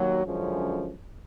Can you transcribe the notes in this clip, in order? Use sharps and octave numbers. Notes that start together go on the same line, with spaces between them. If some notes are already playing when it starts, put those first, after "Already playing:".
Already playing: D#2 F#3
F#2 D3 F3 G#3 C#4